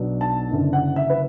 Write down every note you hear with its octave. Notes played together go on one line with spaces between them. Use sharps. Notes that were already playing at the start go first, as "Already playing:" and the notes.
Already playing: B1 B2 F#3 B3 D4
A5
F#1 F#2 D3
F#5
E5
B4